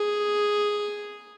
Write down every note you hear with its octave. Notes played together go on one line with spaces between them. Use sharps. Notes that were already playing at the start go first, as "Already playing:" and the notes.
Already playing: G#4